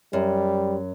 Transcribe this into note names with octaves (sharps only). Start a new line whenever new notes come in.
F#2 G3